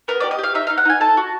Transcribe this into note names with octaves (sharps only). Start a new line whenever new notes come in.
B3 A#4
G4 D5
D#5
G4 F5
D#4 E5
D#4 F5
F#5
D#4 G#5
A4 A5
F#4